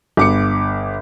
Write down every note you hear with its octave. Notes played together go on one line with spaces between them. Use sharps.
G1 D6 C#7